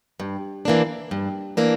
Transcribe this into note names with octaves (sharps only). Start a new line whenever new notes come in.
G2
E3 A#3 D4
G2
E3 A#3 D4